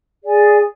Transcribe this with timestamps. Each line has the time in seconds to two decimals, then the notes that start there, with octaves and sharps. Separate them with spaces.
0.24 G#4 D5 G#5